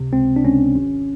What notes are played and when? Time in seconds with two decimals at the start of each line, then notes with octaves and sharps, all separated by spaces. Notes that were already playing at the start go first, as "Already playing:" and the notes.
Already playing: C#2 C3
0.12 C#2 C4
0.36 D4
0.44 C#2 C#4
0.75 G#1